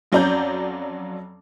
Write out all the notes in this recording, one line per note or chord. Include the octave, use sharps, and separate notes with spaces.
F2 F#3 C#4 D5 A#5 G6